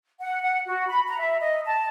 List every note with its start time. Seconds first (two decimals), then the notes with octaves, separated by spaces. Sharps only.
0.21 F#5
0.42 F#5
0.67 F#4
0.89 B5
1.07 A#5
1.19 E5
1.40 D#5
1.66 A5